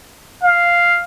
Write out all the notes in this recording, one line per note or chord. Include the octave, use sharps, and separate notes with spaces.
F5